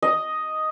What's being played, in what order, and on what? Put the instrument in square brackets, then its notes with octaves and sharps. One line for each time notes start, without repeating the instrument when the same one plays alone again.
[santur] D#5